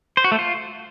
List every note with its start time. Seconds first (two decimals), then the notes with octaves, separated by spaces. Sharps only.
0.17 C5
0.24 F#4
0.32 A3
0.39 F4